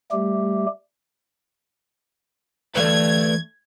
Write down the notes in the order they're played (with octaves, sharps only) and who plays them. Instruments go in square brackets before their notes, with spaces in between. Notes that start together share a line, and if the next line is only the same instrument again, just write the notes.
[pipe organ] G3 A3 G4
[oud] D2 A3 F5 [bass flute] E3 [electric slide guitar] B4 D5 [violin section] G#6